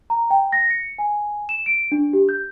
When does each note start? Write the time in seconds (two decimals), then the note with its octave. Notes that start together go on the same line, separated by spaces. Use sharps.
0.10 A#5
0.30 G5
0.52 A#6
0.70 C#7
0.98 G#5
1.49 E7
1.66 D7
1.92 D4
2.13 G4
2.29 G6